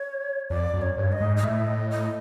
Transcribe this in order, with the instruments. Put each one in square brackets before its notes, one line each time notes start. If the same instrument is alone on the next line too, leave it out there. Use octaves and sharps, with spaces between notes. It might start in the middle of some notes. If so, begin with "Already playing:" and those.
Already playing: [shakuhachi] C#5
[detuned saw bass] F2 [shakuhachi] D5
[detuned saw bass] F#2
[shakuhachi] C#5
[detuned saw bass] G2
[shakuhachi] D#5
[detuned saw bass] G#2
[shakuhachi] D#5
[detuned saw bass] A2 [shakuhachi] E5
[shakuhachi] D#5
D#5